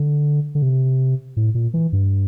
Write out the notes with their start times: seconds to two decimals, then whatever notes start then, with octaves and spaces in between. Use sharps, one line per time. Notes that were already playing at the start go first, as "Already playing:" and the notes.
Already playing: D3
0.55 D3
0.62 C3
1.37 A2
1.55 A#2
1.74 E3
1.93 G2